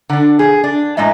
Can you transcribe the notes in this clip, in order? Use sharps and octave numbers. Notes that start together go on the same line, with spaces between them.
D3 D4
G#4
D4
F#2 A2 G#3 D#5 E5